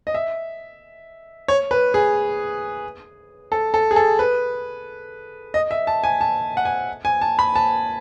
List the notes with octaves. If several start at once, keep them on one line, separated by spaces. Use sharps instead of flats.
D#5
E5
C#5
B4
G#4
A4
A4
G#4
A4
B4
D#5
E5
A5
G#5
A5
F#5
G#5
G#5
A5
B5
A5